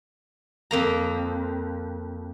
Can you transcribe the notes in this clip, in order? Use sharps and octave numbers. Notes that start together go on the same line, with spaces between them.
F2 A#3 A#5